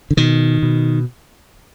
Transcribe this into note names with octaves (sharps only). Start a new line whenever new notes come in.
D3
B2 D#3
B2